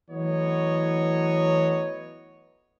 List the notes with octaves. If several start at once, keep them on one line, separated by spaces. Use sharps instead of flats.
E3 F#3 A3 B3 C#5 D#5